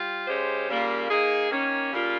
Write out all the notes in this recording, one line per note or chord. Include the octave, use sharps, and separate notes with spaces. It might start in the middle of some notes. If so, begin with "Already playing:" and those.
Already playing: G3 F4
C#3 G#3 C#4 G4 C5
C#3 G3 A#3 F4
A#3 D#4 G#4
D#3 A#3 C#4
C#3 G3 A#3 F4